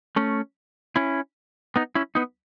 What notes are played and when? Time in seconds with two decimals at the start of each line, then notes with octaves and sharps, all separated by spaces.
0.16 A3 C#4
0.96 C#4 E4
1.76 B3 D#4
1.95 C#4 E4
2.15 B3 D#4